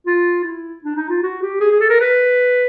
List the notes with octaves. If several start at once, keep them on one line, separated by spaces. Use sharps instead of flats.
F4
E4
D4
D#4
F4
F#4
G4
G#4
G#4
A4
A#4
B4